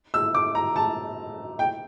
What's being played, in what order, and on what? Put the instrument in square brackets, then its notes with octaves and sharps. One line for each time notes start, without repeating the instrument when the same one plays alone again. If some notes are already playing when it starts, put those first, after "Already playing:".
[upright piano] E6
D6
A#5
A5
G5